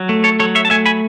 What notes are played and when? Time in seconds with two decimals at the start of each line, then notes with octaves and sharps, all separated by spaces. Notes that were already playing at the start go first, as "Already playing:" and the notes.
Already playing: F#3
0.09 A3
0.24 A4 C#5
0.40 F#3 A4 C#5
0.55 C#5 E5
0.65 A5
0.70 A3 E5 G#5
0.86 G#5 B5